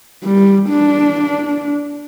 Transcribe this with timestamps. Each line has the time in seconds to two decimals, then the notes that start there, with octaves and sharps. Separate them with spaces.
0.24 G3
0.69 D4